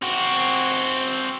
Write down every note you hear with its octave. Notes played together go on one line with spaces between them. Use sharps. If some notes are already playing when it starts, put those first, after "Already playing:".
C4 F#4